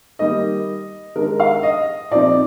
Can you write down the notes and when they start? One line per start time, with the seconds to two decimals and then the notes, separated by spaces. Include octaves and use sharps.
0.19 D#3 G3 A#3 D#4 D#5
1.16 D#3 G#3 D4 A#4
1.40 F5
1.63 D#5
2.11 A#2 F3 C4 D#4 D5